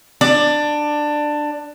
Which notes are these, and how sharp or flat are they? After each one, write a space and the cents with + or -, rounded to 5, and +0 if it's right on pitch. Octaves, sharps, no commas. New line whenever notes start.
D4 +15 D5 +15